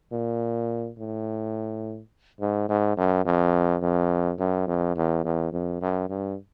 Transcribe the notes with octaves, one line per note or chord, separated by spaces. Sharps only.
A#2
A2
G#2
G#2
F#2
F2
F2
F#2
F2
E2
E2
F2
F#2
G2